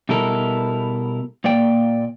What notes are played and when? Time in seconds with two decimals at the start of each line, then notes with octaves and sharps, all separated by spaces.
0.09 B2 G3 E4 A4 A#4
1.44 A#2 A#3 D5 G5